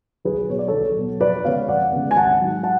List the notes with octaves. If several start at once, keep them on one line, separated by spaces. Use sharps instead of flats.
B1 G#4 B4
B2 F#3 B3 C#5
D5
B1 A4 C#5
B2 F#3 B3
F2 B4 D5
C#3 G#3 B3 C#5 F5
F2 D5 F#5
C#3 G#3 B3
G#5
G#1 F#5 A5
G#2 F#3
F#5 A5